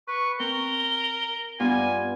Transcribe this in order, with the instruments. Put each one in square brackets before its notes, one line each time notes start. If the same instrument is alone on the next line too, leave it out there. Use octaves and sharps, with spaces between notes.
[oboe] B4 [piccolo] C#6
[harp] C4 [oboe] A#4 [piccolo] G7
[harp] G2 B3 F4 [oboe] G#5